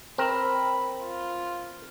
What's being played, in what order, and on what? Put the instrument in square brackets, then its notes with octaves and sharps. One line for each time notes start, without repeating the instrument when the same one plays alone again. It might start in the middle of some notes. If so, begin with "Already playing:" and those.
[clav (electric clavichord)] C4 A#4 [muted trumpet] B5
[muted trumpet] F4